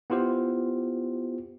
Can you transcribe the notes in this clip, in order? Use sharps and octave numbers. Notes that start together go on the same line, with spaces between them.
B3 E4 F4 G4 C5